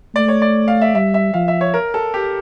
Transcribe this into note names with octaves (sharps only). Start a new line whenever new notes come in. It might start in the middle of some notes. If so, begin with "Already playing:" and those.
A3 D5
C#5
D5
F5
E5
G3 E5
E5
F3 F5
E5
C#5
A#4
A4
G4